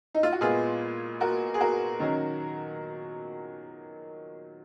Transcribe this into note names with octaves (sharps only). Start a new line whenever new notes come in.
D#4
F4
F#4
A#2 G#3 B3 F4 G#4
F#4 A#4
G#4
F#4 A#4
D#3 F#3 C#4